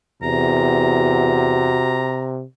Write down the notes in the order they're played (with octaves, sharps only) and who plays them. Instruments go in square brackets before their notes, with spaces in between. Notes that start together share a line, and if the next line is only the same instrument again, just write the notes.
[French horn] E2 [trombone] C3 [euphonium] F#4 [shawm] A#5